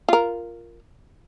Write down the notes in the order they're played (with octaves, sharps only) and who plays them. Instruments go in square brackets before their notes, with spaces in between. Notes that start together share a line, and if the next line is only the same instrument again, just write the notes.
[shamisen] F4 A#4